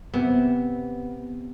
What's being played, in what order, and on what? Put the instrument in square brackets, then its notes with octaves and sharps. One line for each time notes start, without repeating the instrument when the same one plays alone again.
[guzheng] C3 [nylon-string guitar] B3